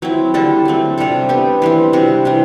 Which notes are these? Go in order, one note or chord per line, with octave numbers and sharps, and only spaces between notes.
F#3 C4 E4
D3 G3 D4 A4
F#3 A3 C4
C3 G3 D4 A4
B3 D4 G4
E3 G3 C4
C3 G3 D4 F#4
C3 E3 G3